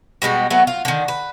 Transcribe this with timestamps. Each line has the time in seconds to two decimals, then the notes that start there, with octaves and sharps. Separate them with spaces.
0.22 B2 G3 G#3 F#4
0.50 F#3 A3 B3
0.67 F4
0.85 D3 D#3
1.08 B4